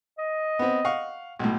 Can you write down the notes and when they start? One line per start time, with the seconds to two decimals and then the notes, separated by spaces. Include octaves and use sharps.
0.18 D#5
0.59 B3 C4
0.85 F5 F#5 C#6
1.39 B1 A2